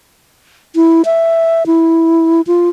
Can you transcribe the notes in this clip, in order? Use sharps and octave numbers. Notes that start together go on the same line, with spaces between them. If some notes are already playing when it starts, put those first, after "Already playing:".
E4
E5
E4
F4